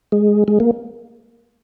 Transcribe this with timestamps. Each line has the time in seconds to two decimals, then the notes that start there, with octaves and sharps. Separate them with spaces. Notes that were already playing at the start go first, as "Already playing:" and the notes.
0.12 G#3
0.48 G#3
0.60 A#3